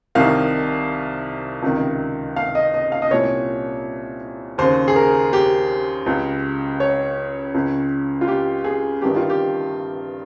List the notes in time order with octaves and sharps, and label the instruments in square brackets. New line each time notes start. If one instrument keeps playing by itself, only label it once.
[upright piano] C2 C3 D#3 F5
C#2 C3 D#3
F5
D#5
D#5
F5
D#5
C2 A#2 C#5
D#2 C#3 C5
G#4
A#4
G4
C#2 C#3
C#5
C#2 C#3
F4
G4
G#4
G1 G2 D#3 G4
F4
G4